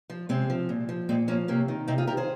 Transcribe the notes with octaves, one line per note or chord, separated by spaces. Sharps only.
F3
C3 G#3 C4
F3
A#2
F3
A#2 G#3 C4
F3 A#3 C#4
C3 A#3 C#4
D#3
C3 C4 D#4
F4 G#4
D#3 G4 A#4
G#4 C5